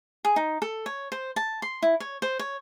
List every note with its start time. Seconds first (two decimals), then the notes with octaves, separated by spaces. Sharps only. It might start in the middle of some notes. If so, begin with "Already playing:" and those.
0.25 G#4
0.36 D#4
0.62 A4
0.86 C#5
1.12 C5
1.36 A5
1.62 C6
1.82 E4
2.00 C#5
2.22 C5
2.39 C#5